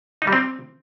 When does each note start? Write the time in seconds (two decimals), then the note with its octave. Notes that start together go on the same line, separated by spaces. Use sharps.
0.22 D#4
0.27 G3
0.33 C4